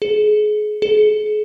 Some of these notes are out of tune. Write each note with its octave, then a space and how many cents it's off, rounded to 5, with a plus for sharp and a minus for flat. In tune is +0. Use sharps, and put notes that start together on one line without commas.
G#4 +30
G#4 +40